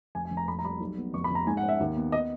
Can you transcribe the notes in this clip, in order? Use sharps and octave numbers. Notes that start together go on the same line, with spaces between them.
F1 G#5
G#5
F1
A#5
F2 B5
A#5
G3 B5
B1
B3
F1 C#6
B5
F1 A#5
G#2 G#5
F#5
C#4
E5
D#2
B3
D#5